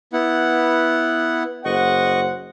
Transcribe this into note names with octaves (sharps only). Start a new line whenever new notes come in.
B3 E4 F#5
F#1 C5 D#5 F#5 C#6